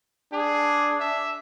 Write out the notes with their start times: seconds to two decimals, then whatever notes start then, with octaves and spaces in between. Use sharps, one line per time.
0.33 D4 G#4
1.00 E5